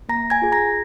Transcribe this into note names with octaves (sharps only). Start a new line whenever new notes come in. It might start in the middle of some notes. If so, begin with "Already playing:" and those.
A#3 A#5 A#6
G#5 G#6
F4 G#4
A#5 A#6